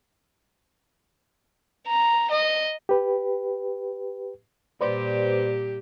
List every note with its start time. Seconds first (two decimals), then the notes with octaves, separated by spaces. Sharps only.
1.87 A#5
2.30 D#5
2.89 G4 B4
4.81 A#2 G3 G4 B4 C5 D5